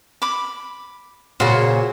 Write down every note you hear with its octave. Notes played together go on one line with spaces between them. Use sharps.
B5 D6
A#2 C#3 F#4 C5